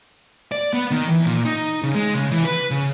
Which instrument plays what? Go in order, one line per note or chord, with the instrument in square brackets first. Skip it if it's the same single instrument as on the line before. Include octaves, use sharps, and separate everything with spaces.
[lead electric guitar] D5
B3
D#3
E3
A#2
D#4
C#3
G#3
C#3
E3
B4
C#3